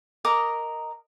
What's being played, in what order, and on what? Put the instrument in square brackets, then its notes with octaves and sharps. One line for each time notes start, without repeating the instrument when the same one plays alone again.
[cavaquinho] A#4 D#5 A#5 D6